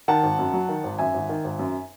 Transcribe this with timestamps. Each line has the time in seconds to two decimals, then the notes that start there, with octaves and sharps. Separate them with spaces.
0.08 D#3 F#5 A5
0.23 G#1
0.38 F#2
0.53 F#3
0.69 D#3
0.84 G#1
0.99 F#2 E5 G#5
1.14 G#1
1.29 D#3
1.44 G#1
1.59 F#2